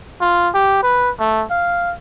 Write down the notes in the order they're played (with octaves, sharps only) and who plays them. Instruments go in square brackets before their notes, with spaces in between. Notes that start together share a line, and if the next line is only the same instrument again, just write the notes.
[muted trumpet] F4
G4
B4
A3
F5